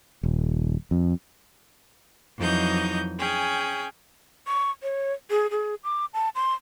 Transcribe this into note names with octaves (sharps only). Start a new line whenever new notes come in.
D#1
F2
F2 E3 F#3 D#4 D#5 G6
C#4 G#4 G5
C#6
C#5
G#4
G#4
D6
A5
C6